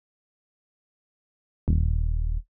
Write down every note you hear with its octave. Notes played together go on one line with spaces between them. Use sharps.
D#1